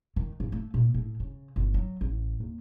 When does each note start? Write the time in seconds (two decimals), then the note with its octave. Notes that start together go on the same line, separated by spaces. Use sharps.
0.16 D#3
0.40 G#2
0.52 A3
0.74 A#2
0.94 A2
1.20 C#3
1.56 G1
1.74 F#3
2.01 A1
2.40 D#2